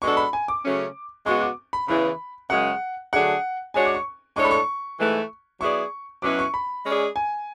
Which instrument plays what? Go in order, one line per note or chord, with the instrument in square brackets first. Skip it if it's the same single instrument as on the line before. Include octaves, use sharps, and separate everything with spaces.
[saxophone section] B2 G#3 D4 F#4 A4 [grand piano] C#6
[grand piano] B5
G#5
D6
[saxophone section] C#3 F#3 A3 C#4
[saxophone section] C#3 G#3 B3 F#4 [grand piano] C#6
[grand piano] D6
B5
[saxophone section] E2 C#3 E3 [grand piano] B5
[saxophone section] F#2 C#3 G#3 [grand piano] F#5
[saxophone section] D3 F#3 A3 D4 G#4 [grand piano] F#5
[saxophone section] G#3 D4 F#4 C#5 [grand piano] G#5
[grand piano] D6
C#6
[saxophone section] A2 G#3 D4 A4 C#5 [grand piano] C#6
[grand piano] B5
C#6
[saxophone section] G#2 E3 A3 E4 B4
[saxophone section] F#3 B3 E4 G#4 D5 [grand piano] C#6
[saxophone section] B2 F#3 C#4 E4 B4 [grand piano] D6
[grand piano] C#6
B5
[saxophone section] G#3 C#4 G#4 D5
[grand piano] G#5